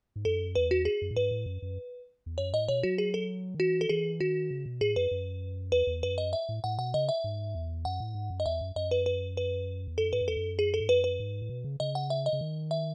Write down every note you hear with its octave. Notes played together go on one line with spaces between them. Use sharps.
G#2
F#2 A4
E2 B4
F#4
G#4
F#2
A2
G#2 B4
A2
F#2
F#2
E2
F#2 C#5
A2 D#5
B2 C#5
F#3 F#4
G#4
A4
D#3
E3 F#4
A4
E3 G#4
D#3 F#4
C#3
B2
A2 G#4
F#2 B4
F#2
E2 B4
E2
F#2 B4
D#5
E5
A2
A2 F#5
B2 F#5
C#3 D#5
E5
G#2
E2
F#2 F#5
A2
G#2
F#2
D#5
E2 E5
F#2
F#2 D#5
B4
B4
B4
E2
F#2 A4
G#2 B4
F#2
E2 A4
F#2
G#4
A4
G#2
F#2 B4
B4
G#2
A2
B2
C#3
C#3 D#5
F#5
E5
D#5
C#3
D#3
E5